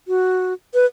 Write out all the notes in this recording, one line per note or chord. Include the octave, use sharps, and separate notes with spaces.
F#4
B4